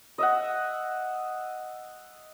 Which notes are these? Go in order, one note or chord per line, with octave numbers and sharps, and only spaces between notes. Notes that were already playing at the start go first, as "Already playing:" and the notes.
D#5 E5 F#5